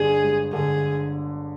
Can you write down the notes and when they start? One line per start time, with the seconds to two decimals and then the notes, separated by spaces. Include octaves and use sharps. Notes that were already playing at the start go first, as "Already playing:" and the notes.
Already playing: G1 D4 G#4
0.23 G#3
0.53 D3 G#4